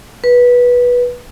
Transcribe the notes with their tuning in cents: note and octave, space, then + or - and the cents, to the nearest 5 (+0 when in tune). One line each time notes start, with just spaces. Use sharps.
B4 -15